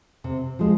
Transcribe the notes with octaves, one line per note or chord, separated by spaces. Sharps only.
C3
F3 G#3